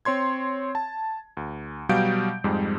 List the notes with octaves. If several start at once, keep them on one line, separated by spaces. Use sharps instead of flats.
C4 C#5 C6 G#6
A5
D2
B2 F#3 G3 F5 G6 D7
F2 G#2 G3 G#3